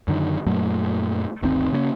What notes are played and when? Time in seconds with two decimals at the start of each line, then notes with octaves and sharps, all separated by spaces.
0.08 F#2 D3 D#3
0.47 F#2 A#2 F#3 A3
1.42 G1 D2 D#3 C4
1.72 C#3 A#3 B3 C#4